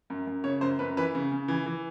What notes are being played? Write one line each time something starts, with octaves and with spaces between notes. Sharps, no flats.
F#2
F#2
C#3 C#5
F#2 C5
F#2 B4
E3 B4
C#3
C#3
E3
E3